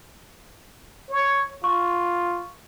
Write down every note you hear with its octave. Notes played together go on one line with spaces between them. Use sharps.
C#5
F4 C#6